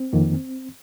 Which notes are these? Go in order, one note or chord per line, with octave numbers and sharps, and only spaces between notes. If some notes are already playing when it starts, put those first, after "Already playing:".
Already playing: C4
F2 D#3 A#3